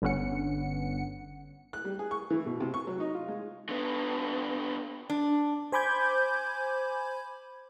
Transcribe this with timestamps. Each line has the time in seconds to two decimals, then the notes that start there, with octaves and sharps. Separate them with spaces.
0.02 G1 D3 B3 C#4 F#5 C#7
1.73 F#6
1.85 G3
1.99 G#4
2.11 C#6
2.30 E3
2.46 B2
2.60 C3
2.74 C#6
2.87 F#3
3.00 D#4
3.15 F4
3.28 G#3
3.69 D3 B3
5.10 D4
5.72 C5 G#5 B5 D6 G6 G#6